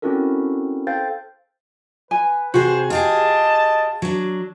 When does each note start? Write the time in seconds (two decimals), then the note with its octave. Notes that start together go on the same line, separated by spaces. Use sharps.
0.02 C4 C#4 E4 F#4 A4 A#4
0.87 A4 C5 F5 G5 G6 A6
2.11 B4 G#5
2.54 C3 F#4 G#4 C5
2.90 F4 G4 G#4 D#5 A5
4.02 F#3 D4